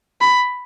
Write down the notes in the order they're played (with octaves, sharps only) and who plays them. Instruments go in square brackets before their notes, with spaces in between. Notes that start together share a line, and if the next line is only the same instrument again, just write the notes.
[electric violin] B5